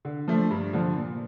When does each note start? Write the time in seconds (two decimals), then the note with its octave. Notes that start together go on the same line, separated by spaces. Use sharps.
0.05 D3
0.28 F3 A3 D4
0.51 G2
0.73 D3 F3
0.96 A#2